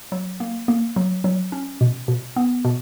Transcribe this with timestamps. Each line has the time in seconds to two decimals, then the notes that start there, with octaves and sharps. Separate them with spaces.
0.12 F#3
0.40 A#3
0.68 A#3
0.96 F#3
1.24 F#3
1.52 C#4
1.81 B2
2.08 B2
2.36 B3
2.65 B2